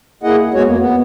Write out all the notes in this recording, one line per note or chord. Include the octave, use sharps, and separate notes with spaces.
A#3 E4 G#4 D#5 F#5
D#2
G#3 B3 F#4 C#5
F2 A#3
B3